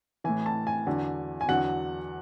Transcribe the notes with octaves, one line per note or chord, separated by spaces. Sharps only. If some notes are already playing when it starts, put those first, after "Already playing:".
A2 E3 G#5
A5
G#5
E2 D3 F#3
G#5
E2 D3 F#3 F#5